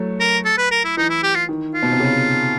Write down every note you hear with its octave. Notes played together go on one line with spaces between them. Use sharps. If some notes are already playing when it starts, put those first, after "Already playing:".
Already playing: F#3 A3
A#4
A4
B4
A#4
E4
E3 D#4
E4
G4
F4
D#3
F4
B2
C3
C#3